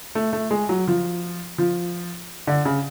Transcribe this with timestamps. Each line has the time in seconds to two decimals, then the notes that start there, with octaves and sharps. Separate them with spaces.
0.15 A3
0.33 A3
0.51 G#3
0.69 F#3
0.88 F3
1.58 F3
2.47 D3
2.65 C#3